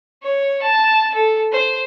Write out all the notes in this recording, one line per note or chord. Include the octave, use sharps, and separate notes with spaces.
C#5
A5
A4
C5